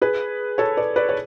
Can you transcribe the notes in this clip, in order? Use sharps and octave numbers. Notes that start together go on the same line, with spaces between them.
G#4 B4
A4 C#5
B4 D5
B4 D5
C#5